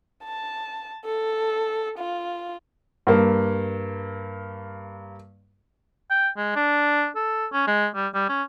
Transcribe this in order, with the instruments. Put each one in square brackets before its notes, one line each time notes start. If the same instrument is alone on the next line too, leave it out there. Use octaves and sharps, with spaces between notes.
[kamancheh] A5
A4
F4
[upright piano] G2 A#3
[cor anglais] G5
G#3
D4
A4
C#4
G#3
G3
G3
C#4